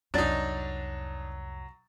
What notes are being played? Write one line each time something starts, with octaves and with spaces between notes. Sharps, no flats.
C2 F2 F#3 D4 D#4 A6